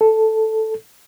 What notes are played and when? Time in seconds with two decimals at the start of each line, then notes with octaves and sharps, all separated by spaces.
0.01 A4